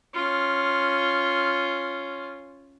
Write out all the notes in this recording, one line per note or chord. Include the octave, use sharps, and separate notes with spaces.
C#4 F4